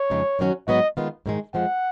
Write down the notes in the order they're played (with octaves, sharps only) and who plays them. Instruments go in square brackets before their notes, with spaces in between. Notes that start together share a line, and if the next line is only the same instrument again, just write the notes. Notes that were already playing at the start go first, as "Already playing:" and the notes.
Already playing: [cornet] C#5
[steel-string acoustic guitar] F2 C#3 G#3 D#4
F#2 D#3 F#3 C#4 F#4
[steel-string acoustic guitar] G#2 F#3 B3 F#4 [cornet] D#5
[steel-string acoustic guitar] D#3 G#3 B3 F4
G#2 D#3 G#3
[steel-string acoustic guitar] F2 F3 G#3 [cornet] F#5